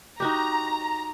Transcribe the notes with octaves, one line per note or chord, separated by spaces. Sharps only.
D#4 F#4 G4 A#5